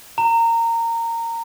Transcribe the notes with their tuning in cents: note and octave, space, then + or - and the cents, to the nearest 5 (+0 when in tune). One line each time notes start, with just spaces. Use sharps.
A#5 -20